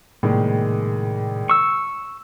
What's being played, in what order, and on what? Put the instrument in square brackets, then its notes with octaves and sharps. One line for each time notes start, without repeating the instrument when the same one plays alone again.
[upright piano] A#1 D#3 G#3 [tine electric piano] A2 C3
[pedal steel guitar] C#6 E6